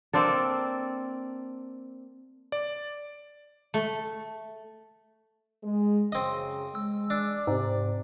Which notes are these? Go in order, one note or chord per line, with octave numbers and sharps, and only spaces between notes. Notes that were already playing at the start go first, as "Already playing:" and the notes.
A#3 C4 D4 A4
D5
A3
G#3
F#2 C#3 C4 D#5
G#3 E6
D4 D5
G#2 C3